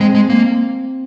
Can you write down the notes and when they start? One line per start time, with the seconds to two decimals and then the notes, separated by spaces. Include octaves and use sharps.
0.01 G#3 C4
0.15 G#3
0.30 A#3